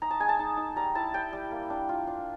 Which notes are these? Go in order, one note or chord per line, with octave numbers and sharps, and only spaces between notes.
D#4 A#5
A5
G#3 G#5
A5
D#4
D#4
G3 A#5
E4 A5
G3 G5
G3
A#3
D4
F4
D4